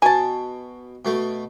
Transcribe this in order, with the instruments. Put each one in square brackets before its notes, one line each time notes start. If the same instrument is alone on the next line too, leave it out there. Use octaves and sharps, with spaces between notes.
[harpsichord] B2 [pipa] G#5 A5
[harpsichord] B2 A3